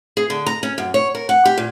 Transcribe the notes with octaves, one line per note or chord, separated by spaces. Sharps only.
G#4
D3
A#5
C#4
F#2
C#5
A#4
F#5
G4
A#2